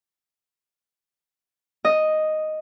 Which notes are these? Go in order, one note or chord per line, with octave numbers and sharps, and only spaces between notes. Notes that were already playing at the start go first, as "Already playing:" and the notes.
D#5